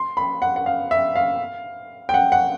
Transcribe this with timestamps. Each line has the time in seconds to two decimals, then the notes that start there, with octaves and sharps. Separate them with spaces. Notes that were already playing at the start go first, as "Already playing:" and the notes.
Already playing: C6
0.17 B5
0.42 F#5
0.56 F#5
0.66 F5
0.91 E5
1.16 F5
2.09 G5
2.14 F#5
2.32 F#5